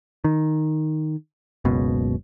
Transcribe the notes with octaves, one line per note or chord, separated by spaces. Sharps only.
D#3
F#1 C#2 B2